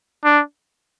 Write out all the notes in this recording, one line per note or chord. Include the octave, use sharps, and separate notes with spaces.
D4